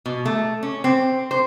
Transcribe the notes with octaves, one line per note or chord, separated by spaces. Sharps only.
B2
A3
C#4
C4
C5